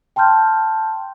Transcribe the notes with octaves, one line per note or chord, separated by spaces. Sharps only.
G5 A5 C6 F6 G6